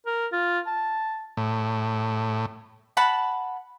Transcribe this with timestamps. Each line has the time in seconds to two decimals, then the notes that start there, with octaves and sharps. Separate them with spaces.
0.06 A#4
0.33 F4
0.67 A5
1.37 A2
2.97 F#5 A5 B5